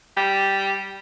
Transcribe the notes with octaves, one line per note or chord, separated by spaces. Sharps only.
G3